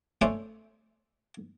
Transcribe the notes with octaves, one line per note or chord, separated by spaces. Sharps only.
A3 C#4 D4 A4 C5